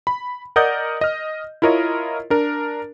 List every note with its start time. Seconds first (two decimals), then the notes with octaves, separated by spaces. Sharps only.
0.07 B5
0.56 A#4 D5 D#5 F#5 D#6 G6
1.01 D#5 F6
1.62 E4 F4 A#4 C#5 D#5
2.30 D4 A#4